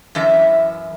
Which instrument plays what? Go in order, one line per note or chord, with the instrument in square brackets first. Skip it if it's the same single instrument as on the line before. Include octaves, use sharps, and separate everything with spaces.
[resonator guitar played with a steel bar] F#2 E3 E5